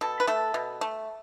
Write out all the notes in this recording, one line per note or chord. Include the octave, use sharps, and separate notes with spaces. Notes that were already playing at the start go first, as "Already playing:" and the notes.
B2 A4
B4
A3 A4
B2
A3